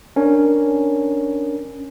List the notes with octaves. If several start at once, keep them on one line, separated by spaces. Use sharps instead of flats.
C#4 D4 A#4 C#5